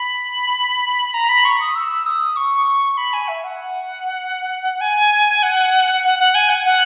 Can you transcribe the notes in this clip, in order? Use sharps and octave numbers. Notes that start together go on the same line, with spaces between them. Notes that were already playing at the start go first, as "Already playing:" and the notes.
Already playing: B5
A#5
B5
C#6
D#6
E6
D#6
C#6
B5
G#5
E5
F#5
G#5
F#5
F#5
F#5
G#5
F#5
F#5